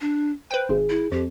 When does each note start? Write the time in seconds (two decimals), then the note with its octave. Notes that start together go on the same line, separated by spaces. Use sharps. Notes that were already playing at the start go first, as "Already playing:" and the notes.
0.01 D4
0.51 B4 C5 G5
0.69 G#1 G#4
0.90 E4
1.12 F2 G4